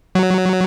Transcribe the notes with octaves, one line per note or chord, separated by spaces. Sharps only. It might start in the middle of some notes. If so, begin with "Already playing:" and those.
F#3